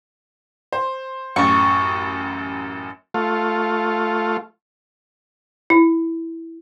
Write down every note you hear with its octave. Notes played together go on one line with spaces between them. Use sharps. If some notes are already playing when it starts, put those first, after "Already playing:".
C5
A1 F#2 C#6
A3 F4
E4